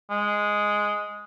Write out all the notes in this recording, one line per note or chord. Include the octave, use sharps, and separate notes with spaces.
G#3